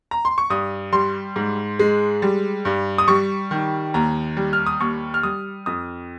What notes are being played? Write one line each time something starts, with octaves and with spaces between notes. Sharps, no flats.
A#5
C6
C#6
G2 D#6
G3 C6
G#2
G#3
G3
G2
D#6
G3 C#6
D#3
D#2 A#5
G3
F6
D#6
D#2 C#6
F6
G3 D#6
F2 D#6